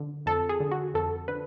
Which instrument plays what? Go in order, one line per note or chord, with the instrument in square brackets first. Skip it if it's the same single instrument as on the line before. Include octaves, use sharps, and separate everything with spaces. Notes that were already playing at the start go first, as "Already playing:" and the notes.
Already playing: [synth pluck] D3
F2 A4
G#4
D3
F#4
F2 A4
D3 B4